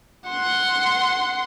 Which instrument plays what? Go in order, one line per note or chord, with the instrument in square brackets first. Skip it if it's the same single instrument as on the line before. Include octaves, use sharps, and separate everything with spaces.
[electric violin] F#5 C6